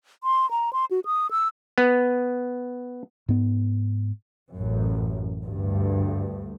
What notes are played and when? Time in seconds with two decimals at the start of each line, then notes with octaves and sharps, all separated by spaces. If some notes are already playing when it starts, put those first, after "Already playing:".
0.24 C6
0.51 A#5
0.73 C6
0.91 F#4
1.05 D#6
1.31 E6
1.78 B3
3.29 G#2 B3
4.53 A1 F#2
5.45 D2 G2